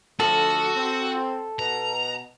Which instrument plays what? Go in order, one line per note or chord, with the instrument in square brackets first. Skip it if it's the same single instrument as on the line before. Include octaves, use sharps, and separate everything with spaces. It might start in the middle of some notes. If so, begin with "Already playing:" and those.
[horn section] D3 F3 A3 [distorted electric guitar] F#4 [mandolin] A4
[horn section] C4
[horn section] B2 [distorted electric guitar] A#5